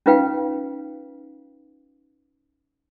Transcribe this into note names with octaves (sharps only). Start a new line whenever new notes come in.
C#4 D#4 F4 B4 F5 G5